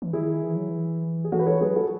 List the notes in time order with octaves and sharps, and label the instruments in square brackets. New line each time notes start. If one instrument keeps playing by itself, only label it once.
[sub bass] E3
[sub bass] D#3 [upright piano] E4 G#4
[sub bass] E3
F#3
E3
[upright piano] G#4
[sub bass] E3 [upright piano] F#4 A4
[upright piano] B4
A4 C#5
[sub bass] F#3 [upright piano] G#4 B4
[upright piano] F#4 A4